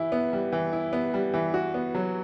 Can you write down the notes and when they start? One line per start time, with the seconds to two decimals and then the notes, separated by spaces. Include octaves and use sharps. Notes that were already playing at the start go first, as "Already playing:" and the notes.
Already playing: E3 E4
0.12 B3
0.33 G3
0.52 E3
0.73 E4
0.93 B3
1.14 G3
1.34 E3
1.54 F#4
1.74 B3
1.95 F#3